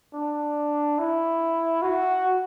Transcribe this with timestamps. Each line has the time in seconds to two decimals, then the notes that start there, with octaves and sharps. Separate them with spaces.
0.14 D4
0.99 E4
1.82 F#4